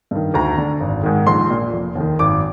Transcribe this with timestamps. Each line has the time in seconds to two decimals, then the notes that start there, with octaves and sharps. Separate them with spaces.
0.11 G2 D#3
0.34 D2 A#5
0.58 D3
0.81 G#1
1.03 G#2 D#3
1.27 A#1 C6
1.50 A#2
1.73 F1
1.95 D#2 D#3
2.19 G#1 D6